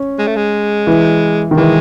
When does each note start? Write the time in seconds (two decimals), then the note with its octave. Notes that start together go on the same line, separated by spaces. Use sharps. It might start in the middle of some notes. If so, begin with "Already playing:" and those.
Already playing: C#4
0.19 G#3
0.27 A3
0.36 G#3
0.87 E3
1.51 D#3
1.57 E3 G#3